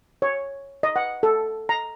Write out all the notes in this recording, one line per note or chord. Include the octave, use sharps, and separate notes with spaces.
C#5
D#5
F#5
A4
A#5